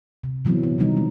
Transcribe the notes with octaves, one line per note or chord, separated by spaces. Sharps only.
C3
A#2 E3 F#3 B3 C4
B3
C3 D#3 E3 G3 D#4
G#3 C4